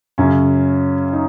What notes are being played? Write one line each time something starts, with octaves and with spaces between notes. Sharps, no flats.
F#2 C#3 C#4
D#4